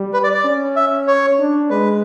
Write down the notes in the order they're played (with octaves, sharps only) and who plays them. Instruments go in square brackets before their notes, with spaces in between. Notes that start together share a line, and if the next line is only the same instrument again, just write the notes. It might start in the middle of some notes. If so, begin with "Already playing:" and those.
Already playing: [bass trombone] G3
[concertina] B4
D5
D5
[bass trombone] C#4
[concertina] E5
C#5
[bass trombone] D4
[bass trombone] G#3 [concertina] B4